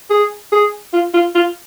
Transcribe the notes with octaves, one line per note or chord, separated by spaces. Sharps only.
G#4
G#4
F4
F4
F4